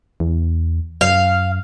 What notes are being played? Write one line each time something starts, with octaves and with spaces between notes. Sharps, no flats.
E2
F#2 F5